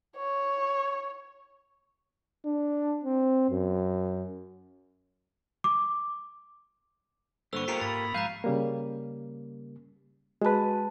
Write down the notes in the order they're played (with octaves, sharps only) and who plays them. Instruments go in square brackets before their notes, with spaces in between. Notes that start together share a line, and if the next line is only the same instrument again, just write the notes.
[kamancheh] C#5
[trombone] D4
C4
F#2
[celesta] D6
[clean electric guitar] G2 D3 B3 [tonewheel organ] A#3 A4 C5 [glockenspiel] C#6 E6
[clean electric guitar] F4 G4 A#4 [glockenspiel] B6 C#7 F7
[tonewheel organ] G#2 A#3 [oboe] B5 [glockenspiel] A6
[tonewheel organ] F3 G#3 [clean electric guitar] F5 [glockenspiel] A#5 F#6 G6
[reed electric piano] C#3 G3 A#3
[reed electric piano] G#3 B4 [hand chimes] F#4 A5